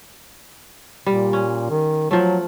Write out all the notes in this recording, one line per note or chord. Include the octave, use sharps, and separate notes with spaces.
A#2 G3
C#4
D#3
F3 F#3 A3